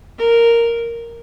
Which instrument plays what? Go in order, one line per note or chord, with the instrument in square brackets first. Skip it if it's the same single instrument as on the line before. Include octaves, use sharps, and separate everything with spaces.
[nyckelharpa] A#4